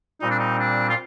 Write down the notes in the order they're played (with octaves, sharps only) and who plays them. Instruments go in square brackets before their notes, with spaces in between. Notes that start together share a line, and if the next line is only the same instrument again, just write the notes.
[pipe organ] A#2 G3 C4 [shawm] D#4
[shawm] D4
D#4
D4
F4